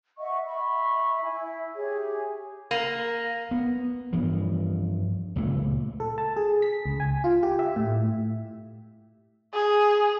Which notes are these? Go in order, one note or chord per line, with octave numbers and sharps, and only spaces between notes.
D#5 E5 F#5 C#6
E5 B5 C#6
E4 E5 G#5
G4 G#4 C#5
A#3
B3
G2 E3 F3
C#2 A#2 C#3 A3
A4
A5
G#4
B6
C#2
G#5
F4
G4
E5
A2
G#4